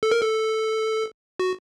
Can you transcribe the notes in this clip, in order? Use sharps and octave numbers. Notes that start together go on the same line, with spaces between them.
A4
A#4
A4
F#4